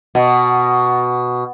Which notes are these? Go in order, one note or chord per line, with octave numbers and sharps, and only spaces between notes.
B2